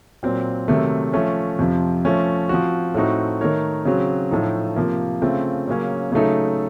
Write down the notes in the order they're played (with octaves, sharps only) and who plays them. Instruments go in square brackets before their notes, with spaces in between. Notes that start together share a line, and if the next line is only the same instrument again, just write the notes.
[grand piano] A#2 F#3 C4
C3 D#3 F#3 A3
F3 A3 C#4
F2 C3 F3
F3 A3 C#4
F3 C4 F#4
A2 A3 C4 D#4 F#4
D#3 A3 D#4 A#4 C#5
C#3 F#3 C4 F#4
A2 F3 A3 D#4
C3 F3 A#3
C#3 A3 C4 F4
C#3 F#3 A#3 C#4
C#3 F#3 A3 D#4 A4